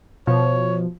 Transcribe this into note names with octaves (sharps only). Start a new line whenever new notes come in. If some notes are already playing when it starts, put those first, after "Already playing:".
B2 F3 C#5